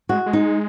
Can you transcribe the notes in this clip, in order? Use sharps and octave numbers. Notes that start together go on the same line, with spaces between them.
G#3 F#4
G#3
D#4